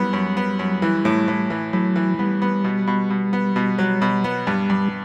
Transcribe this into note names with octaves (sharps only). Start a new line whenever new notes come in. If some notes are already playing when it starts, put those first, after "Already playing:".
Already playing: F#2 E3 G3 B3
F#2
B3
F#2
E3
A2
A2
E3
A2 F#3
E3
G3 B3
B3
B2
B2
B2
B3
B2
F#3
B2
B3
G2 G3
G2